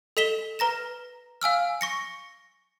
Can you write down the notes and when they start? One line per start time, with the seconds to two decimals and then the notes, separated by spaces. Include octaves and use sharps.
0.17 A4 D#5 B6 E7 G7
0.59 B4 A#5 A#6 E7
1.42 F5 G#5 E6 F6
1.81 C#6 A#6 C#7